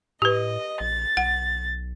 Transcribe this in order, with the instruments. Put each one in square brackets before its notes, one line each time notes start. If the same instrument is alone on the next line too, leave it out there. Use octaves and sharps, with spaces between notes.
[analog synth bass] A2 [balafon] G4 B4 [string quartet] D#5
[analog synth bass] A#1 [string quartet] A6
[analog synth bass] B1 [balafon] F#5